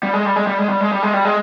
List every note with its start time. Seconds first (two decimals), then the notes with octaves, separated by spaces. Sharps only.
0.03 G3
0.14 G#3
0.25 G3
0.36 G#3
0.47 G3
0.58 G#3
0.69 G3
0.81 G#3
0.91 G3
1.03 G#3
1.14 G3
1.25 G#3